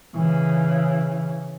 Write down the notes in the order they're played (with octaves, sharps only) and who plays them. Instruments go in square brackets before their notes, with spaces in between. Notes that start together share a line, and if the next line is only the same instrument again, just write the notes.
[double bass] C#3 E3